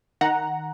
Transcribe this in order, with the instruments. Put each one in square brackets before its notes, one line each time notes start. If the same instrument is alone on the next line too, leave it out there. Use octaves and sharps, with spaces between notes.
[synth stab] D#3 F#5 A#5